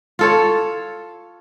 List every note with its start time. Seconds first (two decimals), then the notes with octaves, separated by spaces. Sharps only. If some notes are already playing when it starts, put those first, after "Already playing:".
0.19 F4 A4 C#5